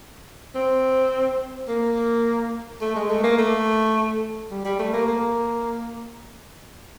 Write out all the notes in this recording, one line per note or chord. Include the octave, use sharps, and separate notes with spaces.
C4
A#3
A3
G#3
A3
A#3
A3
G3
G3
A3
A#3
A#3